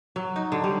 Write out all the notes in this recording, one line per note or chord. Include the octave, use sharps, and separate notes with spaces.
F#3
D#4
D3
G3